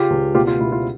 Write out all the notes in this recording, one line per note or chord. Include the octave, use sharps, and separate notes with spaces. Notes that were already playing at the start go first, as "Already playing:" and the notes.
Already playing: C#3 F4 G4
C#2
B2 F4 G4
F4
B2 E4
F4